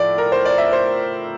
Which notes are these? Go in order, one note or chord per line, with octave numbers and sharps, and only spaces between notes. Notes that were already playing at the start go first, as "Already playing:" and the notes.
Already playing: A2 F3 D5
A#4
C5
D5
E5
C5